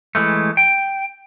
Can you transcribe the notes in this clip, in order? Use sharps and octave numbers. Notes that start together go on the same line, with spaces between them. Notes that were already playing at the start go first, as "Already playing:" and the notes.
E3 G#3 A3
G5